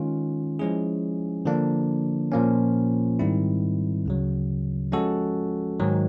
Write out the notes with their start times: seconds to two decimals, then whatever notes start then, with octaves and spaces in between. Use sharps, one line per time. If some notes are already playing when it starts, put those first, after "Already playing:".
Already playing: D#3 G#3 C#4 F4
0.59 F3 G#3 C#4 E4 G#4
1.45 D3 F3 A#3 D4
2.32 A#2 F3 A#3 C#4
3.19 G#2 D#3 G3 C4 E4
4.06 D2 C#3 F#3
4.92 F3 G#3 C#4 F#4 A4
5.79 G#2 D#3 F#3